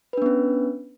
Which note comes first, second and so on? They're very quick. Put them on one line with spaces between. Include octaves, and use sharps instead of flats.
B4 D4 B3 C#4